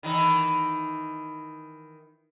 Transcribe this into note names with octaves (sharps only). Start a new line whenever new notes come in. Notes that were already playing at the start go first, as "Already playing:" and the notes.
D#3 E3 D#4